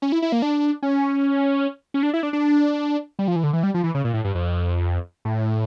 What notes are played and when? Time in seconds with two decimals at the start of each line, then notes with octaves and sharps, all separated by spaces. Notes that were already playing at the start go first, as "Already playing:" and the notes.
0.02 C#4
0.12 E4
0.22 E4
0.32 A#3
0.42 D4
0.83 C#4
1.94 C#4
2.03 D4
2.14 E4
2.23 D4
2.33 D4
3.19 G3
3.28 F3
3.36 E3
3.44 D3
3.53 E3
3.63 G3
3.74 F3
3.84 E3
3.95 C#3
4.04 A#2
4.14 A2
4.25 G2
4.35 F2
5.25 A2